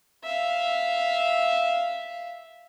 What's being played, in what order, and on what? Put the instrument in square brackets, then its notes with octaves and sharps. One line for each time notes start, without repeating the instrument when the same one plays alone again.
[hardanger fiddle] E5 F5